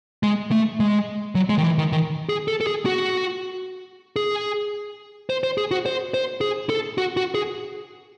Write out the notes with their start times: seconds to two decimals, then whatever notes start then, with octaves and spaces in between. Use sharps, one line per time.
0.23 G#3
0.52 A3
0.80 G#3
1.35 F#3
1.49 G#3
1.58 D#3
1.64 E3
1.78 D#3
1.92 D#3
2.29 G#4
2.48 A4
2.61 A4
2.67 G#4
2.86 F#4
4.16 G#4
5.30 C5
5.43 C5
5.58 G#4
5.71 F#4
5.86 C5
6.14 C5
6.41 G#4
6.70 A4
6.98 F#4
7.17 F#4
7.35 G#4